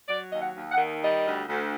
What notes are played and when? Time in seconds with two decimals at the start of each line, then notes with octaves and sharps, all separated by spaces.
0.08 F#3 D5
0.31 D#2 D#5
0.39 F#5
0.55 D#2
0.71 F#5
0.77 D#3
1.01 G3 D#5
1.25 D2
1.47 D2